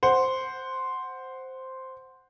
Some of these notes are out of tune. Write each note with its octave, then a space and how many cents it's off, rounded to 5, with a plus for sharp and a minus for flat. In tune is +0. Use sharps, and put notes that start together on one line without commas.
C5 +0 F#5 +0